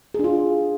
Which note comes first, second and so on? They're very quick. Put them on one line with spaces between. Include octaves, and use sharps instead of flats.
G#4 D4 F4